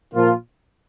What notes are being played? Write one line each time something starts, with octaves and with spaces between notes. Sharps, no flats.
A#2 F3 A#3 F4